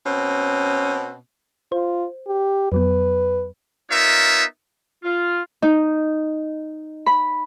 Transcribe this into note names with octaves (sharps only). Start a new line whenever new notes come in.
B2 C4 C#4
F4 C5
G4
F2 F#3 B3 B4
B3 D#4 F4 A#4 C#5 E5
F4
D#4
B5